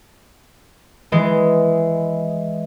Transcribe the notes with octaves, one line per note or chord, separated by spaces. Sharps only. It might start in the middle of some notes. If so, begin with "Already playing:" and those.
E3 G#3